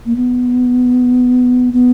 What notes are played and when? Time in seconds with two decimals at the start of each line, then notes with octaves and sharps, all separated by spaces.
0.06 A#3
0.16 B3
1.73 B3